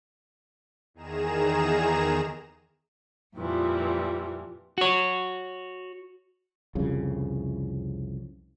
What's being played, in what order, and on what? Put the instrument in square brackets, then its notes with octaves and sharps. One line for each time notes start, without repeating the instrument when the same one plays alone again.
[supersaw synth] E2 D#3 G#4 A#5 E7
[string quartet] F2 A#2 E3 F3 G3
[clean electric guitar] F#4 C#5
[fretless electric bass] C2 F2 C#3